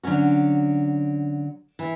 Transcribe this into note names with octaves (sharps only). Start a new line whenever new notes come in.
D3 F#3 C#4 F#4
E3